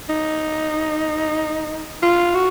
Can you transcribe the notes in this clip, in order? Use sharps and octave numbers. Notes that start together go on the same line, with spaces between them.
D#4
F4
F#4